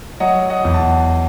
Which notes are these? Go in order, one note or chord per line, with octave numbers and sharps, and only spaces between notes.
F#3 D#5 F#5
D#5 F#5
E2
A5